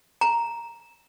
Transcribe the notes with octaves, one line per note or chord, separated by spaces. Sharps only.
A#5